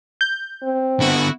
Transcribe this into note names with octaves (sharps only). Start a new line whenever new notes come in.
G6
C4
D3 B3 E4 F#4